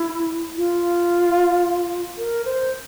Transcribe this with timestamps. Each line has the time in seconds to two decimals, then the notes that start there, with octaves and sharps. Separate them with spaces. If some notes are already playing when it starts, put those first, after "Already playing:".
Already playing: E4
0.57 F4
2.18 A#4
2.46 C5